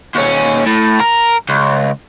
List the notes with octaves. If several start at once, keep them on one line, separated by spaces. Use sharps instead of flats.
D#2 C#4
A2
A#4
C#2